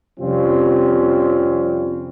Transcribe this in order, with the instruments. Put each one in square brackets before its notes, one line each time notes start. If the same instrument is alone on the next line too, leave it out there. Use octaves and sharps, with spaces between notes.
[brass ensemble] F2 C3 G3 C4 C#4 F4